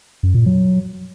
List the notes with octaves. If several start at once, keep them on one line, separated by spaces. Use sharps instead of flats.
F#2
A#2
F#3